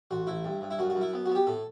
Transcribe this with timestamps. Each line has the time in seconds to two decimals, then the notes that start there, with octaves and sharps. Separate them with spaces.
0.11 A1 F#4
0.27 A1 E4
0.45 G2
0.61 G2
0.71 E4
0.79 F#2 F#4
0.90 F#4
0.95 F#2
1.01 E4
1.13 B3
1.26 B3 F#4
1.35 G4
1.47 A2 A4